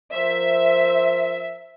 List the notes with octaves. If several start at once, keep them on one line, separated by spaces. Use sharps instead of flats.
F3 A#4 C5 E5